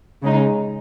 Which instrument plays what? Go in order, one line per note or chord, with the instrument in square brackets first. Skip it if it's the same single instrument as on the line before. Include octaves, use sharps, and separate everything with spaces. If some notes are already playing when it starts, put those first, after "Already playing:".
[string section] C#3 G#3 D#4